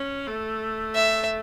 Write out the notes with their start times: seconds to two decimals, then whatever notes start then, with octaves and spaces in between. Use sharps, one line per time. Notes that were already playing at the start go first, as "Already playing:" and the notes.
Already playing: C#4
0.27 A3
0.95 E5